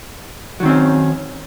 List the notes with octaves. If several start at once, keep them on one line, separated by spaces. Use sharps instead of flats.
D#3 F#3 C4 C#4